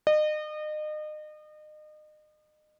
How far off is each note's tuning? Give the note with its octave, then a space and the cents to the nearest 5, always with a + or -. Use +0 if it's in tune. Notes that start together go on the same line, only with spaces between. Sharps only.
D#5 -35